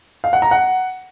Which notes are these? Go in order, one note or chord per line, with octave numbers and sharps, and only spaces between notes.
F5
F#5
A#5
F#5